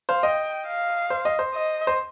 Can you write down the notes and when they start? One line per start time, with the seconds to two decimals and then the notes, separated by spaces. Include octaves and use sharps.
0.09 C5 F5
0.23 D#5 G5
0.67 F5
1.10 C5
1.25 D#5
1.39 C5
1.54 D#5
1.87 C5